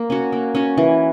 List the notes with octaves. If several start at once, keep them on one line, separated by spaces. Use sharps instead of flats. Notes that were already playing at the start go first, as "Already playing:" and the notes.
Already playing: A#3
C#4 F#4
A#3
C#4 F#4
E3